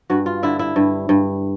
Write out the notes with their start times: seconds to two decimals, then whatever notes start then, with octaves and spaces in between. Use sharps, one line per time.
0.10 G2 F#4
0.26 F4
0.43 D3 E4
0.59 E4
0.76 G2
1.09 G2